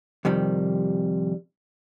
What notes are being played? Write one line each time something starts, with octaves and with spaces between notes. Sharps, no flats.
F2 C3 D#3 G3